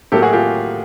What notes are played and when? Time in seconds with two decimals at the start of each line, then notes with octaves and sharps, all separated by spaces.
0.12 A2 F#3 A#3 G4 A4
0.23 F#4 G#4
0.33 F4 G4